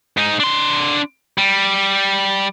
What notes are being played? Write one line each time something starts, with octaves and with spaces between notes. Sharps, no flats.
G#2 D#4
D4 C6
G3